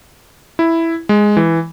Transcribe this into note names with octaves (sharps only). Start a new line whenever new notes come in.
E4
G#3
E3